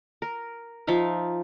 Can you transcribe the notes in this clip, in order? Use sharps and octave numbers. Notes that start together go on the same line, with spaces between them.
A#4
F3 D#4 E5 F5